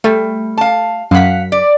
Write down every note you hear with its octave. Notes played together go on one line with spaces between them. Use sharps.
G3 A3
F5 A5
F#2 F5 F#5 B6
D5